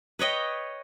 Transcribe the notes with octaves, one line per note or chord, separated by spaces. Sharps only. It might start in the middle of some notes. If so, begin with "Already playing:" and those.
B4 C#5 D#5 G5